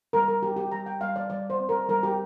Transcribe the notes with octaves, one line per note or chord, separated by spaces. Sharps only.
G3 A#4
A#4
G3 G4
G4
G3 A#5
G5
G3 F5
D5
G3 D5
C5
C4
A#4
G3 A#4
G4